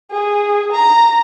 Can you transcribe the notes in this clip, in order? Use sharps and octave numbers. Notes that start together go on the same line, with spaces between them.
G#4
A#5